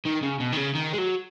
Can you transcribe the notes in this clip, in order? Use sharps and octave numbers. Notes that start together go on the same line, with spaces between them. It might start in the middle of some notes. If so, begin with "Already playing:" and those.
D#3
C#3
B2
D#3
C#3
D#3
G#3
F#3